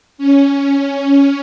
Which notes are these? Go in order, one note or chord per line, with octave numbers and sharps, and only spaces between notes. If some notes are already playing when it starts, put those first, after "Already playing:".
C#4
C#4